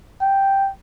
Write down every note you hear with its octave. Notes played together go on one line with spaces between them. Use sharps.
G5